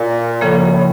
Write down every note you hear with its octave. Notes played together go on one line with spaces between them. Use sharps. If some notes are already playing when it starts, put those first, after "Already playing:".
Already playing: A#2
A2 C#3 F3 A#3
F#2
A2